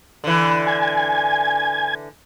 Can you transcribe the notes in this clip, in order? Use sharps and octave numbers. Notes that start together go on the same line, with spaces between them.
D3 E3
G#5